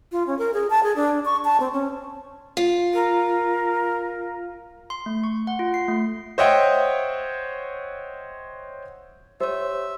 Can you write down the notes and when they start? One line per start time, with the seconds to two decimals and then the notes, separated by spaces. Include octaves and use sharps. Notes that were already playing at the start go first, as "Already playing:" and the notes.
0.12 F4
0.27 C#4
0.38 A#4
0.54 G#4
0.70 A5
0.83 G#4
0.96 D4
1.25 C#6
1.45 A5
1.60 C4
1.73 C#4
2.57 F4
2.94 A#4
4.90 C6
5.06 A3
5.24 C#6
5.47 F#5
5.59 F4
5.74 C7
5.88 A3
6.38 C5 C#5 D#5 E5 F#5 G5
9.40 G4 C5 C#5 E5